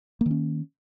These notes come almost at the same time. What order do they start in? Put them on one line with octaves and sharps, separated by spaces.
A#3 D#3 C#4